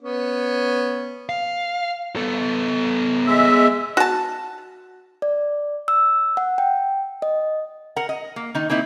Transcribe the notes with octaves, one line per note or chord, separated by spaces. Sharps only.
B3 C#4
F5
B3 A4
G#3 E5
F#4 A5
D5
E6
F#5
G5
D#5
A#4 F#5
D#5
A#3
D#3 D#4
A#3 C4 D#4 E4